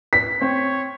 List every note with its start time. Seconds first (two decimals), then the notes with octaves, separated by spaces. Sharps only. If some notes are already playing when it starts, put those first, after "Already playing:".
0.13 B6
0.42 C4 C#5